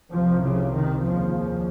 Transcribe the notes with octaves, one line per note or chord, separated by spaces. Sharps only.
C2 C3 F3
C#3
D#3
D#2 C#3 F3